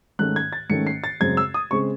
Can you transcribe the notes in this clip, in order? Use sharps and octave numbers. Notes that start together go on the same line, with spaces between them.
G#2 D#3 A3 C#4 F#6
G#6
A6
G#2 D#3 A3 C#4 C#7
C7
A6
F#2 C#3 G#3 C4 G#6
E6
D#6
C#3 G#3 C4 C#6